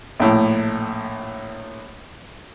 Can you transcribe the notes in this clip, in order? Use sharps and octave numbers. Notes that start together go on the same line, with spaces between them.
A#1 A2